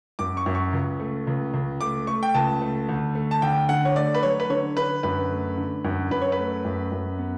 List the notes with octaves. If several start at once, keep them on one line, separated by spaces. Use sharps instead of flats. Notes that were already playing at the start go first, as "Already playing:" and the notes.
F#2 D6
C#6
F#2
C#6
C#2
A3
C#2
C#2
A3 D6
A3 C#6
G5
C#2 A5
A3
D2
A3
A5
D2 G5
D3 F#5
C#5
A3 D5
B4
F#3 C#5
B4
D3 C#5
D3 B4
F#2 B4
A3
D3
F#2
F#2 B4
C#5
B4
A3
F#2
F#2
B3